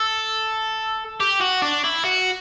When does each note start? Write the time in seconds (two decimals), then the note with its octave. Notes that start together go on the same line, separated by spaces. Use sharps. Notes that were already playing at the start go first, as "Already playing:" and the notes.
Already playing: A4
1.20 G4
1.41 F#4
1.62 D4
1.84 E4
2.04 F#4